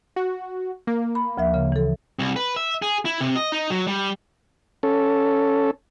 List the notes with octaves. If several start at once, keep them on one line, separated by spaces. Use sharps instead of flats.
F#4
A#3
B5
D2 F3 E5
C#3
E3 A4
C2
B4
E5
G#4
E4
C3
D#5
D#4
F#3
G3
C#4 A4